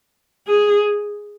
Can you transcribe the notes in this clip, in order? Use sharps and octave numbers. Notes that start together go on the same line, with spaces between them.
G#4